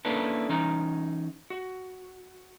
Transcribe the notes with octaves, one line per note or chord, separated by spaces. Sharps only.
A#3 C#4 D4 E4 A4 B4
E3 C#4 D#4 A#5
F#4